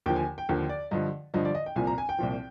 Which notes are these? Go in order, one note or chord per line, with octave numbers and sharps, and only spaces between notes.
D#2 D3 F3 G5
G#5
G5
D#2 D3 F3
D5
G2 D3 F3 D#5
G2 D3 F3 D#5
D5
D#5
G5
C2 A#2 F3 G#5
A#5
G#5
G5
C2 A#2 F3